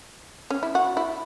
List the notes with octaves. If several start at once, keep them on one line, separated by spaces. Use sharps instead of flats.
C#4
E4
F#4
E4